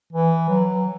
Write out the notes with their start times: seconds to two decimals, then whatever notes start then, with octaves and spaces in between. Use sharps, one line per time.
0.13 E3
0.49 F#3